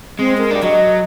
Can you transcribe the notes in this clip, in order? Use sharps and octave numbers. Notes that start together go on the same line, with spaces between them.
G#3 C4
A#4
D4 G4
F#3 D#5